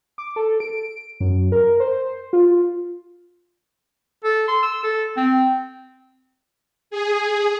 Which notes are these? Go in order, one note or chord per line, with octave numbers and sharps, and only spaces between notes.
D6
A4
D7
F#2
A#4
C5
F4
A4
C6
E6
A4
C4
G#4